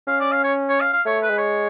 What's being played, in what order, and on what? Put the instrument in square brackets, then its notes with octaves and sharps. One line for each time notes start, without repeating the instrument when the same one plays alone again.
[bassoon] C#4 [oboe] F5
[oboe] D5
F5
C#5
C#5
F5
F5
[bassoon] A3 [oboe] C#5
[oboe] B4
[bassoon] G#3
[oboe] C#5